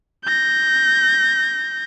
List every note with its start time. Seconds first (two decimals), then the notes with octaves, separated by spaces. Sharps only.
0.24 G6 A#6